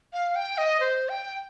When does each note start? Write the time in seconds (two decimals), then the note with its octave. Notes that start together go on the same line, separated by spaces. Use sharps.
0.13 F5
0.36 G5
0.58 D#5
0.80 C5
1.09 G5